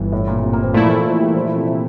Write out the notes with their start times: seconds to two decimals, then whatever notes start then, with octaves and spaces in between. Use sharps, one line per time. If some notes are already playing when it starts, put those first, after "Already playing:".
Already playing: G1 G2 E3
0.12 A2
0.27 A#2
0.38 A#2
0.43 C3
0.53 A#3
0.63 C4
0.74 A#2 F3 A3 E4
0.84 E3
0.89 F3
1.05 F3
1.20 G3
1.28 E3
1.35 F3
1.46 E3
1.55 C3
1.66 C3